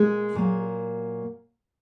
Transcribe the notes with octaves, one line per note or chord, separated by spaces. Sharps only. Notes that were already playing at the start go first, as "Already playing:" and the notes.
Already playing: A#2 G#3 A#3 G#4
A#2 F#3 A#3